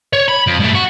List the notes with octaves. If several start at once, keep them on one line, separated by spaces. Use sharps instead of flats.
C#5
B5
F2
G2 A3
F#4